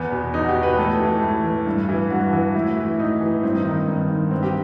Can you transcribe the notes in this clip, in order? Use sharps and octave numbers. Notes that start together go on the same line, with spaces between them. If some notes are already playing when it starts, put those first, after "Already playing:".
Already playing: E2 B3
B2
E2 D#4
F#4
G4
B2
B4
A2 A4
E3
A2
E3
G2
E3
G2 F#4
E3
A2 E4
E3
A2 D#4
E3
G2 C4
D#4
D#3 D#4
G2
D#3
G2 C4
G4